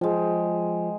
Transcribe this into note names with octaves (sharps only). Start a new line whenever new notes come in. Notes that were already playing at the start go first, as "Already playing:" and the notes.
F3 G#3 G5